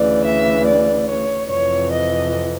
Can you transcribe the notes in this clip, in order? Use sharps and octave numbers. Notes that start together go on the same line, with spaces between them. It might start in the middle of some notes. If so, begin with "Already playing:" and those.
Already playing: D2 C#3 E3 D5
E5
D5
C#5
F2 C3 E3 C#5
D#5